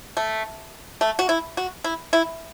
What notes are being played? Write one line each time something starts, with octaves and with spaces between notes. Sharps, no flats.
A3
A3
F#4
E4
F#4
E4
E4